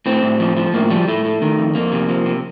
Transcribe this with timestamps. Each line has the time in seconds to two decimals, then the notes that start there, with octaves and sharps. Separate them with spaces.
0.06 A2 C4
0.22 A2
0.40 F3
0.57 F3
0.74 A2 A#3
0.90 F3 G3
1.08 A2 A3
1.25 A2
1.42 D#3
1.59 F2
1.75 F2 A#3
1.92 C3
2.09 F3
2.26 C3